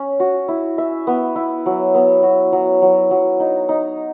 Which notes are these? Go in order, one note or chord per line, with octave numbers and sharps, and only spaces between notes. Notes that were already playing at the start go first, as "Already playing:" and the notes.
Already playing: C#4
F#4
E4
E5
B3
E4
F#3
B3
F#4
F#3
F#3
F#3
D#4
D#4